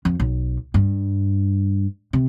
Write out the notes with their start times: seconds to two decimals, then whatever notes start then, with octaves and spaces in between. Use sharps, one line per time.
0.05 F2
0.20 B1
0.74 G2
2.13 C3